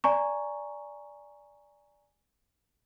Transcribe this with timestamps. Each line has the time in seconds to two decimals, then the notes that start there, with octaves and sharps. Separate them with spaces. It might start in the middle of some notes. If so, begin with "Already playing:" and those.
0.04 D5 G#5 A#5 C#6